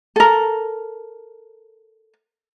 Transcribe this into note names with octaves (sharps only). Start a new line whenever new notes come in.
A4 A#4